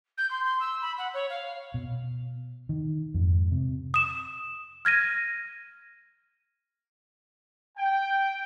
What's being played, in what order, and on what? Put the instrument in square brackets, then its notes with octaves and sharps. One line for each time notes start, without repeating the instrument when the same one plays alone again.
[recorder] G6
C6
C6
E6
B5
F#5
C#5
F5
[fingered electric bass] B2
D#3
F2 G#2
C3
[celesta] D#6 E7
F6 G#6 A#6 D#7
[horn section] G5